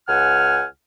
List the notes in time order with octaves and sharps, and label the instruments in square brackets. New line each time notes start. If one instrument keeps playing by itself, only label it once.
[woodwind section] C#2 F#5 G#5 F6